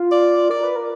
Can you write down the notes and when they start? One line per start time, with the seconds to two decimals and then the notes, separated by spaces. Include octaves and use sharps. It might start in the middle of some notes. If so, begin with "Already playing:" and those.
Already playing: F4
0.11 D5
0.50 A#4 D5
0.63 B4
0.76 A#4